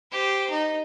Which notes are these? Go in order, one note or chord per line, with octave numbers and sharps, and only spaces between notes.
G4 C5
D#4